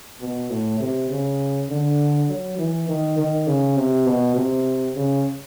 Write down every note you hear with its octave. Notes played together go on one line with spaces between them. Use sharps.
B2
A2
C3
C#3
D3
F#3
E3
D#3
D#3
C#3
C3
B2
C3
C#3